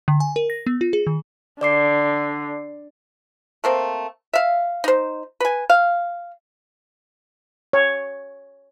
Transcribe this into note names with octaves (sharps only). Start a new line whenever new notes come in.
D3
G#5
A#4
A#6
B3
F4
G#4
D#3
D3 D5 D6 C7
A3 A#3 C4
E5 F5
D#4 C5
B4 G#5
F5
C#5